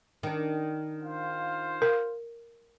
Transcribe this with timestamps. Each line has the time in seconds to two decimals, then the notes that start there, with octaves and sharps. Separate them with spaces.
0.23 D#3 D4
1.01 F4 C5 F5
1.82 A#4